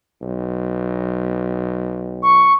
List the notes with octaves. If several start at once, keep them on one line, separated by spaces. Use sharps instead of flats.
B1
C#6